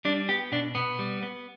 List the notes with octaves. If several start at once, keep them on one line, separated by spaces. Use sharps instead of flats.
G3 D4
B3 G4
B2 D4
B2 B3
G3
B3